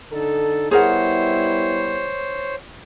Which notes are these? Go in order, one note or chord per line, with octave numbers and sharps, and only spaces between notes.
D3 D#4 A4
G3 B3 E4 G#4 A#4 C5 C#5 F#5